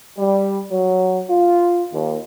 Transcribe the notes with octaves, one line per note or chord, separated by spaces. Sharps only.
G3
F#3
F4
D#2